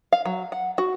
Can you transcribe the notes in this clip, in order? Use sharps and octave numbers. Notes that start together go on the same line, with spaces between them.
F5
F#3
F#5
F#4